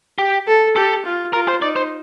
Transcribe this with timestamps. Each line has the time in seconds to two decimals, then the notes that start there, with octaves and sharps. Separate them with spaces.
0.19 G4
0.47 A4
0.76 G4 A4
1.05 F4
1.33 F4 A#4
1.48 C5
1.62 D#4 D5
1.76 C5